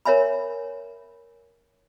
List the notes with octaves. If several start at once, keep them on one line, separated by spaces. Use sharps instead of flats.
A#4 C#5 E5 G#5 B5